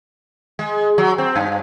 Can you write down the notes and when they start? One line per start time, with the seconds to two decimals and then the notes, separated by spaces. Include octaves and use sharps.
0.59 G#3
0.98 F#3
1.18 C4
1.36 G2